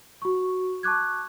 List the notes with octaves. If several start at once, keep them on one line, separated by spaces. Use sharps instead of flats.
F#4 C#6
A5 C#6 D6 F#6 G#6